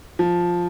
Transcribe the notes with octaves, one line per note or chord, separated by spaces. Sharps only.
F3